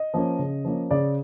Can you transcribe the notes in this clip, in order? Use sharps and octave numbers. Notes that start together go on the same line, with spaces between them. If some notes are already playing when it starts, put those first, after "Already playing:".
Already playing: D#5
F3 A#3 C#4
C#3
F3 A#3 C#4
C#3 D5